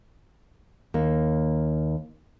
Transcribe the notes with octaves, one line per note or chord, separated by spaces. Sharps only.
D#2 A#3